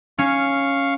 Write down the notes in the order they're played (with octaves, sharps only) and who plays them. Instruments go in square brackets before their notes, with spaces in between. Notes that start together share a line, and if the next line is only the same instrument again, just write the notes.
[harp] C#4 [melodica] F5 C#6